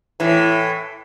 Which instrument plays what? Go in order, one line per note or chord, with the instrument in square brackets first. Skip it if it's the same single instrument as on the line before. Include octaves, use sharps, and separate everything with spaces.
[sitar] A2 E3